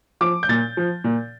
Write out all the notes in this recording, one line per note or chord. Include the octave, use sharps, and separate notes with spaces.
F3 D6
G6
A#2 A6
F3
A#2